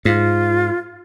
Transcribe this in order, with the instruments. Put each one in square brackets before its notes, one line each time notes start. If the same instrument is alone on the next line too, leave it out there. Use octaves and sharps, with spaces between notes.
[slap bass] G#2 [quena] F4